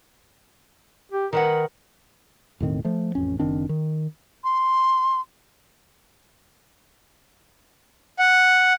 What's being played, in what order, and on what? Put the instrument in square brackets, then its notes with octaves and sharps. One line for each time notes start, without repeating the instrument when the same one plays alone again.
[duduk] G4
[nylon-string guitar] D#3 B4 F#5 [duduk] A#4
[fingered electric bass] E1 A2 D#3 C4
F3 A3
A1 F2 C#4
F#1 D#3 C4 D4
D#3
[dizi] C6
[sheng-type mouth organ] F#5